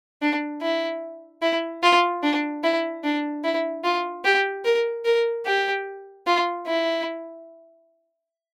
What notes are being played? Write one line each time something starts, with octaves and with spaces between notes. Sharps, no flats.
D4
E4
E4
F4
D4
E4
D4
E4
F4
G4
A#4
A#4
G4
F4
E4